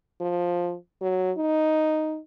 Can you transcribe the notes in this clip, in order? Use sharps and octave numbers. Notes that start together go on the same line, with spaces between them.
F3
F#3
D#4